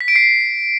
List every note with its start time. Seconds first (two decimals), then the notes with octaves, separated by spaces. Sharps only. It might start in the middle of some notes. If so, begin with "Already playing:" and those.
0.01 B6
0.08 D7
0.16 C7